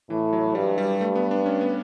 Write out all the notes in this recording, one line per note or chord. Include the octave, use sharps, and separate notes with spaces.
A2 E3
F#3
G2 G3
G3
A3
B3
D4
C#4
B3